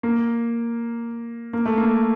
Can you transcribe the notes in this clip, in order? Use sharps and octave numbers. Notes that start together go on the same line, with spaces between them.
A#3
A#3
A3
A#3